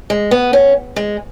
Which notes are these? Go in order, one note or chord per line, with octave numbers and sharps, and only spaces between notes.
G#3
B3
C#4
G#3